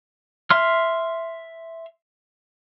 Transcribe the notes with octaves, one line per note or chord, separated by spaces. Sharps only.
E5 C6 F6